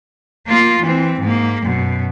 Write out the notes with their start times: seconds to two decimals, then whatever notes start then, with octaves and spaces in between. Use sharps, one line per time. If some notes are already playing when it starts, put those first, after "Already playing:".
0.47 A#3 F4
0.82 E3 C4
1.21 G#2 A#3
1.62 F#2 B2